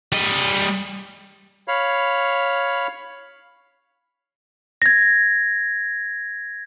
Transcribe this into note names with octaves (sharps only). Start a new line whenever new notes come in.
G3 D#5
C#5 F5 B5
G#6 A#6